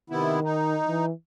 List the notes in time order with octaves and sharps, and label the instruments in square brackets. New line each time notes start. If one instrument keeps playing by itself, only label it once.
[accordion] C3 B3 E4 [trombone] D#3
[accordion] D#4
[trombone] E3